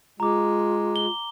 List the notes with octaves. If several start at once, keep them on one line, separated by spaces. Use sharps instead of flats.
G#3 F4 A#5 D6
G7